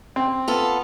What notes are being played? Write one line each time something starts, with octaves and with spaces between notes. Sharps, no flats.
C4
B3 F4 A4